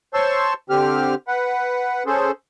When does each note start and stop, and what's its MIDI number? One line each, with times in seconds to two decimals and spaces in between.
0.14 0.54 72
0.14 0.54 73
0.14 0.54 81
0.14 0.54 84
0.14 0.54 85
0.14 0.54 88
0.70 1.15 50
0.70 1.15 60
0.70 1.15 67
0.70 1.15 89
1.28 2.03 71
1.28 2.03 78
2.06 2.31 61
2.06 2.31 68
2.06 2.31 69
2.06 2.31 72